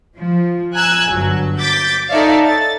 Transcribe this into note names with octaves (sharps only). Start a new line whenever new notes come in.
F3
G#5 A#5 E6 F#6 G#6
G1 F#3
D6 G6 A6 B6
D#4 A4 C#5 D5 E5 F5
A6